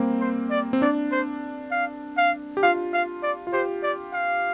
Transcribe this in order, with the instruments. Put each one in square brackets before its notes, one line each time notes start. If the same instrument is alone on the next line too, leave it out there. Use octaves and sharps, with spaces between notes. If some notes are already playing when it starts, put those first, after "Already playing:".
Already playing: [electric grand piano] G3 A#3 C4
[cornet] C5
D5
[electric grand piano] C4
[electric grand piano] D4 [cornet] D5
[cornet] C5
F5
F5
[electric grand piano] G4
[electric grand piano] F4 [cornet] F5
[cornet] F5
D5
[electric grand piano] F4
[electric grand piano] G4 [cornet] C5
[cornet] D5
F5